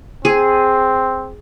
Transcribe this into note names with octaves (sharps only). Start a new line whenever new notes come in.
C4 G#4